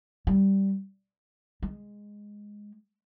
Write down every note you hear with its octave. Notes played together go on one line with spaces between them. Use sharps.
G3
G#3